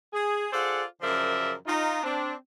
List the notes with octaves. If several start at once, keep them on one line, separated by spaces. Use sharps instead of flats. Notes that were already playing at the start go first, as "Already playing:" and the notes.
G#4
F4 G#4 A4 C5 D5 F#5
F#2 C#3 F3 A#4 D5 E5
D#4 F4
C4 D4